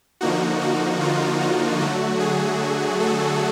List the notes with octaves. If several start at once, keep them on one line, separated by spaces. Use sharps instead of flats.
D3 F3 A#3 D#4 F#4
F#4
F4
F#4
D3 F#3 A3 F#4
G#4
A4